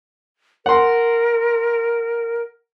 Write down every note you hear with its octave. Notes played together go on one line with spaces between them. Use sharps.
A#4 F#5 C6